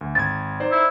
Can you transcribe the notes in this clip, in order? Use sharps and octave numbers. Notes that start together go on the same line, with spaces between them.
D2
G#1 G#6 A6
D#4 C5 D5
E4